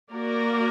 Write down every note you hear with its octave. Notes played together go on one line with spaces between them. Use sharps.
A#3 F#4 A#4 D5